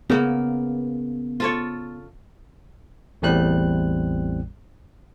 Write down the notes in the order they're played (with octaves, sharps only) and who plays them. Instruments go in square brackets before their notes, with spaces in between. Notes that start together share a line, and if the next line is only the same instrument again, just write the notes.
[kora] C#3 A#3 [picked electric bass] B3
[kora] F4 A4 C#5
[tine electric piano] A1 E2 A2 G3 C4 F#6